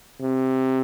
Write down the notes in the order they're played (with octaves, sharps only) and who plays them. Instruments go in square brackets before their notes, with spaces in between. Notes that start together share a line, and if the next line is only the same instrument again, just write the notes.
[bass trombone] C3